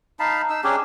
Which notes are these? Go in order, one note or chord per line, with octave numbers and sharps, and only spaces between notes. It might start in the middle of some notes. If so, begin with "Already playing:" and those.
D#4 F5 A5 B5
D#4 E6
C#4 D4 G4 G#4